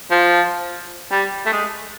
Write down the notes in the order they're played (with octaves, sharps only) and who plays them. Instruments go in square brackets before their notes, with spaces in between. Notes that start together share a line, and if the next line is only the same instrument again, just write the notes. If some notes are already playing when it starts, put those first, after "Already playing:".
[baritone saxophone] F3
G3
A3
G#3